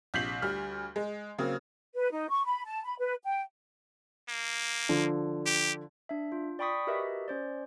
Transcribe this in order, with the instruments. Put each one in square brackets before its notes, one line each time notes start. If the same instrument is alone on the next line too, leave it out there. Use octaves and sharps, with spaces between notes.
[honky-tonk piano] A#1 C3 G6 B6 C7 F#7
D2 G3 F6
G#3
C#3 F#3 A#3 C4
[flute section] B4
D#4
C#6
B5
A5
B5
B4
G5
[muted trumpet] A#3
[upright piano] D3 F3
[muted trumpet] G4
[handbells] D4 E5
F4
D5 G5 B5 C#6 D#6 B6
F#4 G4 A#4 B4 D#5 E5
C#4 C5 D5